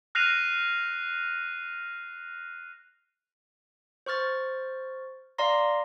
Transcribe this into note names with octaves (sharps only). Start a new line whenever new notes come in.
F6 F#6 A#6 C7 D#7 F7
C5 C#6 F6 A6
D5 F5 A#5 C6 A#6